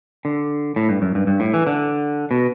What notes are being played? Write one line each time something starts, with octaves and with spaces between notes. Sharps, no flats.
D3
A2
G2
F#2
G2
G2
A2
E3
D3
B2